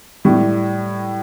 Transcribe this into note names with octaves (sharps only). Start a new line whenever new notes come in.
A2 G3